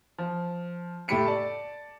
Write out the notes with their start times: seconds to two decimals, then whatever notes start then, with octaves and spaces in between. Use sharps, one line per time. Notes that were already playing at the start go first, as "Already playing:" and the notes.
0.18 F3
1.08 A2 A3 G4 B5 C#7 D7
1.26 D5 A5